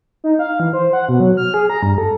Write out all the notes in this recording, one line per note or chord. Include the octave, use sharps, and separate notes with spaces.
D#4
F5
E3
C5
F#5
B2
F#3
F6
G#4
A#5
G2
A4